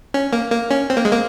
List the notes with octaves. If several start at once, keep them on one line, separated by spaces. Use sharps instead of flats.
C#4
A#3
A#3
C#4
C4
A#3
G#3
A#3